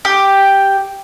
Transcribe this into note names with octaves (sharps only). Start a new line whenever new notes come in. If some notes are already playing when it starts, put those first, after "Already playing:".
G4